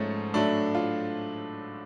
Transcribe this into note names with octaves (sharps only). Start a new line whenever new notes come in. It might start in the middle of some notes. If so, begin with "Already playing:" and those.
Already playing: G#2 F3 A3 C#4
A2 F#3 A3 D4
F4